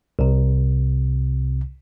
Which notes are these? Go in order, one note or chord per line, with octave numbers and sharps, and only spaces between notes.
C2 C3